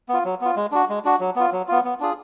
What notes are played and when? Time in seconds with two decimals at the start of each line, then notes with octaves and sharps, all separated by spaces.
0.09 B3 F4
0.25 F#3
0.41 B3 F4
0.56 G#3
0.72 D4 F#4
0.89 G#3
1.05 D4 F#4
1.20 F#3
1.36 B3 F4
1.52 F#3
1.68 B3 F4
1.84 B3
2.00 D4 F4 G#4